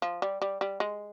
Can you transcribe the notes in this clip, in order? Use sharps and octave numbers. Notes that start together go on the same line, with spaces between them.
F3
G3
G3
G3
G#3